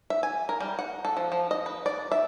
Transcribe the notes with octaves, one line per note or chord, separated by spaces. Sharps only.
E5
G#5
A#4
G3
F#5
A4
F3
F3
D#5
B4
D5
E5